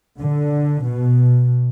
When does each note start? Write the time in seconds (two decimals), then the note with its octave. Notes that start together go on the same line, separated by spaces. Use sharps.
0.19 D3
0.84 B2